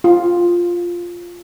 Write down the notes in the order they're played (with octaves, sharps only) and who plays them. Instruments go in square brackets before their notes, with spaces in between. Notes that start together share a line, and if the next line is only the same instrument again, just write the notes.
[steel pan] F4